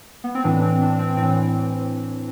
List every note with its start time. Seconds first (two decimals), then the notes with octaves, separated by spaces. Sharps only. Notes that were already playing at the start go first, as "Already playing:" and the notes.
0.24 B3
0.35 C4
0.44 A2 E3 D4
0.62 C4
0.81 D4
0.99 C4
1.17 A2 C4
1.22 E3